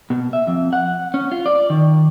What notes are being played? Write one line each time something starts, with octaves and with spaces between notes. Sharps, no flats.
B2
E5
F2
F#5
C#4
F4
D5
D#3